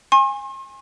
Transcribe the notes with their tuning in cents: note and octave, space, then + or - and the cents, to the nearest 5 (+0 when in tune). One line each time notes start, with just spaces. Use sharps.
G#5 -20 C6 +45